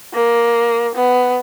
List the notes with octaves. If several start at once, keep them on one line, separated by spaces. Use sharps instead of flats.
A#3
B3